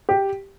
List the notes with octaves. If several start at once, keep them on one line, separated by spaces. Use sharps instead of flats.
G4